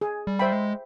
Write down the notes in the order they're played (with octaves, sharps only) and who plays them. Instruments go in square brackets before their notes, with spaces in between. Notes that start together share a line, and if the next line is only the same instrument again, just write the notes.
[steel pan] G#4
[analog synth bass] G3
[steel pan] C5 E5 G5 B5
[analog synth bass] G#3